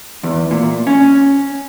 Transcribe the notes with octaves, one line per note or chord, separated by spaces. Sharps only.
E2
A#2
C#4